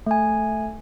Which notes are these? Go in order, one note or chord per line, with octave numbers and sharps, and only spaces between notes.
A3 G#5